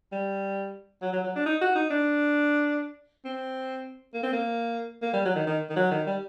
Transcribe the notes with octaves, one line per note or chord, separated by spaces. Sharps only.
G3
F#3
F#3
F#3
D4
D#4
F#4
D#4
D4
C4
A#3
C4
A#3
A#3
G3
F#3
D#3
D#3
D#3
F#3
D#3
G3